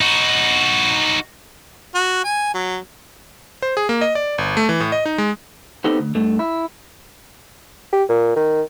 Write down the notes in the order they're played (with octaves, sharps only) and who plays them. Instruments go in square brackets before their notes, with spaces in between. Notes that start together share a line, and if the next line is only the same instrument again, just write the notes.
[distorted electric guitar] D#4 F#4
[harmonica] F#4
G#5
F#3
[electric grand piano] C5
G#4
A#3
D#5
D5
G1
A3
E3
A2
D#5
D#4
G#3
[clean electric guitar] B3 C4 D#4 G4 A4 C5
D2
G2 A3
E4
[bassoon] G4
A#2
D#3